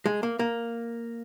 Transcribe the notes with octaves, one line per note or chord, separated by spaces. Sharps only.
G#3
A#3
A#3